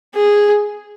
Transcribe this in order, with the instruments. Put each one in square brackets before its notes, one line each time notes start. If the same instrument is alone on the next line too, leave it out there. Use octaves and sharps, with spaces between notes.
[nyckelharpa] G#4